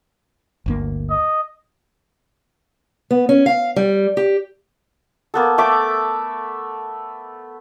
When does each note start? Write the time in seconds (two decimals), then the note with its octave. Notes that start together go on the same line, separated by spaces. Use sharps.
0.66 G1 D2 A#3
1.10 D#5
3.11 B3
3.29 C#4
3.46 F5
3.76 G3
4.17 G4
5.34 A#3 B3 A4
5.58 A3 E5 D6